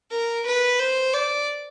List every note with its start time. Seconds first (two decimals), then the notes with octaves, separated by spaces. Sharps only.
0.11 A#4
0.45 B4
0.79 C5
1.14 D5